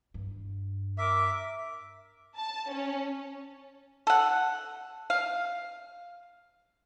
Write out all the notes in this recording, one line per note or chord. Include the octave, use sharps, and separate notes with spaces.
G2
A#4 E5 D6
A5
C#4
A4 F#5
F5